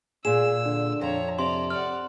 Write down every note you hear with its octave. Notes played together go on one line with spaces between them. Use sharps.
A#2 G#4 E6 E7
D3
F2 C#5 A#5
C3 D5 A#5 C6
D5 F#5 F6